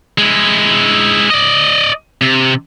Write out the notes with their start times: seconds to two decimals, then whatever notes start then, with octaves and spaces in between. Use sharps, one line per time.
0.18 G#3 E4
1.30 D5 D#5
2.21 C3